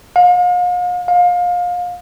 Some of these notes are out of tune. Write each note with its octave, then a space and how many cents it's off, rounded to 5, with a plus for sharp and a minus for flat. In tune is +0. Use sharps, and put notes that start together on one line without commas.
F5 +40
F5 +25